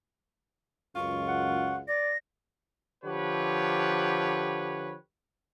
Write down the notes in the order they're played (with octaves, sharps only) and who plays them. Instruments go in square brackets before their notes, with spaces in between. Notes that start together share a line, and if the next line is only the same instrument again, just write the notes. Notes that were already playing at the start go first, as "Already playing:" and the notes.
[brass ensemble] C#2 F#2 [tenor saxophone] F4 [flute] C#6
[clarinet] F#5
[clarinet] D5 [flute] A#6
[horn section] D3 F3 G4 B4 C#5